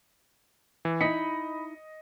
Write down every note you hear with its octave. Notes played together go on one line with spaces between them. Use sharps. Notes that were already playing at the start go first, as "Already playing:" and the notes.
E3
D#4 E4 D#5 B5 C#7